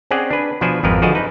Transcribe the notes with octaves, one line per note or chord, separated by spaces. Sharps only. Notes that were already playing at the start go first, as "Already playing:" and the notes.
C4 C#4 G#4 D5 F#5
D4 B4
B2 F3 D4 B4 C5 G#5
G#1 F2 F3 A#4 B4
D3 F3 F#4 G#4 D#5 A5
D#4 B4